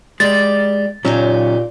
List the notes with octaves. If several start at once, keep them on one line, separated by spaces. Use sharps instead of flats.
G#3 G4 D5 A6
A#2 C#3 F#3 C#4 D#4 G4